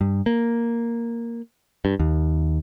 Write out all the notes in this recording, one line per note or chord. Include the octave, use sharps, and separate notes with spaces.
G2
A#3
G2
D#2